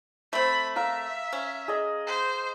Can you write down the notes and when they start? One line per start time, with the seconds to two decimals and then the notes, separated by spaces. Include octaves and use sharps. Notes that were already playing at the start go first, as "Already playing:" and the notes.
0.33 A3 C4 B5
0.76 A#4 E5 F5
1.33 C#4
1.68 G#4 D#5
2.07 C5